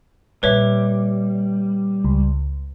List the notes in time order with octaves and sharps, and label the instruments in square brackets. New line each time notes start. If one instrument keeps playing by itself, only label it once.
[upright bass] A#2 [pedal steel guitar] G3 [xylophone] B4 C#5 E5
[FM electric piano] C#2